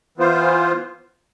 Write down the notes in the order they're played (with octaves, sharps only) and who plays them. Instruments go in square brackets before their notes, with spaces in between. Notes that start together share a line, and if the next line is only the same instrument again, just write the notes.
[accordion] E3 B3 F4 C5